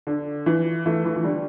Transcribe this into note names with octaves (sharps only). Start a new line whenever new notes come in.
D3
E3
E3 A3
E3 A3
E3
D3 G3